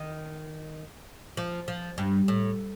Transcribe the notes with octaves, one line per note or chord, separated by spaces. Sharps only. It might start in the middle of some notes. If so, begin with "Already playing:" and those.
Already playing: D#3
F3
F3
G2
A2